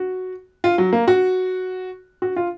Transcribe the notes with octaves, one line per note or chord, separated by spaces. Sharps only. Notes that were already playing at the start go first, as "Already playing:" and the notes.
Already playing: F#4
F4
F#3
A#3
F#4
F#4
F4